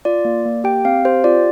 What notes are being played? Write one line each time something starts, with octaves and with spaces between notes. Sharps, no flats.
F4 D5
A#3
A#3
G4 G5
C4 F5
G4 C5
F4 D5